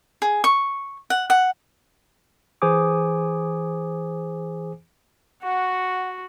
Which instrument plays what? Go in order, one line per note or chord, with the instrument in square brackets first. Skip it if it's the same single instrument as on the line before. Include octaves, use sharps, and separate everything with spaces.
[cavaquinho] G#4
C#6
F#5
F#5
[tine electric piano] E3 G#4 C5 G#5 D6 D#6
[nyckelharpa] F#4 [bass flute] F#5